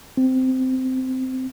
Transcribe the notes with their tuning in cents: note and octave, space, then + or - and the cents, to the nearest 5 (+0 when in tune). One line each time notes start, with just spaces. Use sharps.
C4 -15